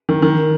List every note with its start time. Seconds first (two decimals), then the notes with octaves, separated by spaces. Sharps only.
0.09 D#3
0.22 D#3